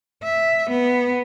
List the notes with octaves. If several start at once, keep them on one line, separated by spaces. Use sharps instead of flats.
E5
B3